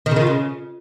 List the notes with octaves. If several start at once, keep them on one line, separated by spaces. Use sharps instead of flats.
D#3
C#3
D#3
F4
C#3